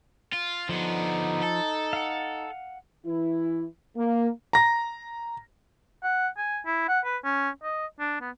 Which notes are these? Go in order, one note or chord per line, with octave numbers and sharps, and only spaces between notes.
F4
D3 F3 B3 D#4
A4
F5 F#5
E3 E4
A#3
A#5 A#6
F#5
G#5
E4
F#5
B4
C#4
D#5
D4
B3